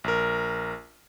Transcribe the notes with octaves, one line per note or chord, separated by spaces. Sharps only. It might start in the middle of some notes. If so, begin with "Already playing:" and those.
A#1 A#4